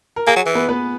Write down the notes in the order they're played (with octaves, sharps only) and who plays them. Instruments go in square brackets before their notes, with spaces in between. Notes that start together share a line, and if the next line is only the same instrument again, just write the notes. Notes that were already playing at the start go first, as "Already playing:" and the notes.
[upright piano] A#4
[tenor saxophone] A#3 [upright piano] G#4
[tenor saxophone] F#3
E3
[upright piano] B3 B4
B3 B4